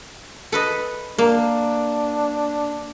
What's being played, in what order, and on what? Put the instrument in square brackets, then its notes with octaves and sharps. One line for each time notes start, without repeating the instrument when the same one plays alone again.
[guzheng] A4 B4 D#5
[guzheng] A#3 [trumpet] D4